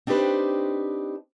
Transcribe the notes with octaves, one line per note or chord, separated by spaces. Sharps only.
C4 D4 D#4 G4 B4 C5